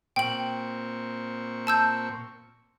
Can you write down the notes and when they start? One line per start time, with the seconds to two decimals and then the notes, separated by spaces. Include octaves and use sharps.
0.16 A#2 C4 G5 C#6 F#7
1.67 A5 E6 G6